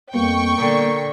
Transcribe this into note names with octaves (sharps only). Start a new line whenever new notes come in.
F2 G3 A#3 B3 G5 C#6
A#2 D3 A#4